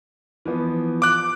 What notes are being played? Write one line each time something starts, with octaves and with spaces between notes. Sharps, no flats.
E3 F3 B3
D6 F#6